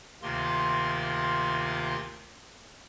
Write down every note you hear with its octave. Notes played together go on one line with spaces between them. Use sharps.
D2 C3 D#3 A#3 F4 C6